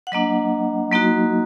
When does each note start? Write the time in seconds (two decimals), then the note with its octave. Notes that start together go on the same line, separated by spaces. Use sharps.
0.07 F#5
0.12 F#3 A#3 D4 D#5
0.92 F#3 A#3 D#4 F#4